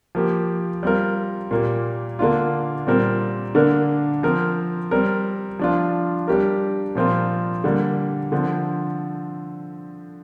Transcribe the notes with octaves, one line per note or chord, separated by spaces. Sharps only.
F3 A#3 G4
G3 C4 F4 A#4
A#2 A#3 G4
D3 A#3 D4 F4
A#2 G3 C4 A#4
D3 A#3 D4 A#4
F3 C4 A#4
G3 C4 A#4
F3 D4 F4
G3 D4 G4 A#4
A#2 F3 C4 F4 A#4
D3 G3 A#3
D3 F3 C4